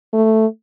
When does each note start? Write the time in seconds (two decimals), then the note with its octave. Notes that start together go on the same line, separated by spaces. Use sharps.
0.14 A3